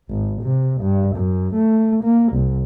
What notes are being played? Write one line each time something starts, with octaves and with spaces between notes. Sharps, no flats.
G#1
C3
G2
F#2
A3
A#3
C2